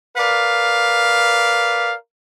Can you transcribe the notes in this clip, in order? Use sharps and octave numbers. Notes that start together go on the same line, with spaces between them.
A#4 B4 D5 F5